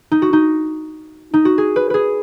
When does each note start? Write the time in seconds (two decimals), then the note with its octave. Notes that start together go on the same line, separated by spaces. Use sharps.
0.11 D#4
0.22 F#4
0.33 D#4
1.34 D#4
1.45 F#4
1.58 G#4
1.76 B4
1.90 G#4 B4